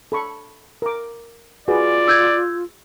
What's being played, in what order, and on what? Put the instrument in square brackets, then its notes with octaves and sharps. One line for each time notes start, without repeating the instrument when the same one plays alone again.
[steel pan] A4 B5 C#6
A#4 D6
[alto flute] F4 [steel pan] F#4 G#4 B4 [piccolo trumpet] D5
[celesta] E6 G6 G#6